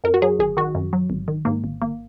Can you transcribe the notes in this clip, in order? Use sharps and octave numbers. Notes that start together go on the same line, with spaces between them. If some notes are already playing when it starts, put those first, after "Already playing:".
F#2 A#4
F#4
F#3 G#4
G#1 G#4
D#3 F#4
F#2
F#3
G#1
D#3
G#2 A#3
G#1
G#1 A#3